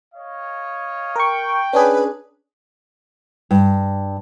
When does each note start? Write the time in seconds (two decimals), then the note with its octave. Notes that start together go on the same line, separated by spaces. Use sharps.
0.13 C#5 D#5 F5
1.16 A#4 G5 C#6
1.73 C#4 D4 G#4 B4
3.51 G2